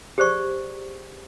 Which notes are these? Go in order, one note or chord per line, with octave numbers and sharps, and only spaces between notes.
G4 G#4 C5 D5 C#6